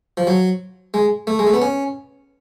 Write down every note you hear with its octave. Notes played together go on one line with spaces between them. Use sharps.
F3
F#3
G#3
A3
G#3
A3
B3
C#4